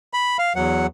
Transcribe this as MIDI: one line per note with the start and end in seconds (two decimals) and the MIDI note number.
0.14 0.37 83
0.39 0.53 77
0.56 0.87 40
0.56 0.87 54
0.56 0.87 78